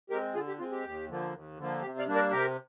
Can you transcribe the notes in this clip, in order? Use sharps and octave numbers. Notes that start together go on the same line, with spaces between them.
G#3 C4 G4 A#4
D3 F4 G#4
G4
G#3 C4 F4
G4
D#2
D3 F3 A#3
D#2
D3 F3 A#3
C3 G4
D5 F5
G3 A#3 D4
A#4 D5
C3 G4 A#4